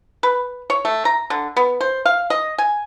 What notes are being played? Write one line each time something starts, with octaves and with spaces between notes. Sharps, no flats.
B4
C#5
A3
A#5
D3
B3
C5
F5
D#5
G#5